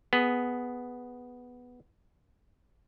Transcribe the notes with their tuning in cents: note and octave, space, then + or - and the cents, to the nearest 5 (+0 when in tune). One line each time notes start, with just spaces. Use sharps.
B3 +0 G#4 +5